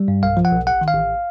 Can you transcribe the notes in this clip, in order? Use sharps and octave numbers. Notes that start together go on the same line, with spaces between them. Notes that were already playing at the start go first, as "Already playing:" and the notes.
Already playing: G3
G2
B1 F5
F3
F#5
B1
A1 F#5
D#3
F5
A1